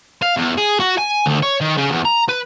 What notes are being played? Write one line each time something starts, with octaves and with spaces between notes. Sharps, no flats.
F5
E2
G#4
F#4
G#5
D2
C#5
D#3
C#3
E2
A#5
B4